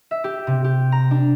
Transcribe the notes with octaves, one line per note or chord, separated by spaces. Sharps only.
E5
G4
C3
G4
A#5
D4